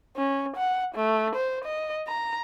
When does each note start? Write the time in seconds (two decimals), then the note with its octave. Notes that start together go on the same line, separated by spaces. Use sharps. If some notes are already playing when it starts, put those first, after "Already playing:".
0.16 C#4
0.56 F#5
0.95 A3
1.35 C5
1.64 D#5
2.07 A#5